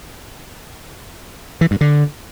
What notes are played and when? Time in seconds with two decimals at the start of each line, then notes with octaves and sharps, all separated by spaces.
1.61 E3
1.71 G2
1.81 D3